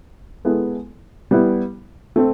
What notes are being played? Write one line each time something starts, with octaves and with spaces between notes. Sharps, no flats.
G#3 B3 E4 A4
G3 B3 E4
A3 C4